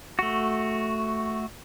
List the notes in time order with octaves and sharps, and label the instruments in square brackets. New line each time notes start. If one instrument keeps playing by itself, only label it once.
[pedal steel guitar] A3 F#4